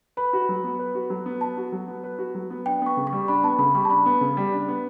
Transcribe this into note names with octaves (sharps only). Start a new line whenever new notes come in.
B4 B5
F#4
F#3
B3
B4
F#4
F#3
B3
B4 A5
F#4
F#3
B3
B4
F#4
F#3
B3
D4 G5
B3 C#6
C#3
C#6
G3
D4 B5
B3 A5
C#3 B5
G3 C#6
A5
D4 B5
B3
C#3
G3
D4
B3